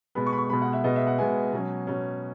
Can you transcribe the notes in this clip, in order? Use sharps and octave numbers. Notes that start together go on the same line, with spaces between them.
B2 G#3 B3 B5
C#6
B5
C#6
B2 G#3 B3 B5
F#5
E5
B2 G#3 B3 D#5
E5
F#5
B2 G#3 B3 G#5
B2 F#3 C#4
B2 F#3 C#4